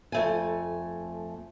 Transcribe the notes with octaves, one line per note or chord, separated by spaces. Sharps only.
F2 A3 G#5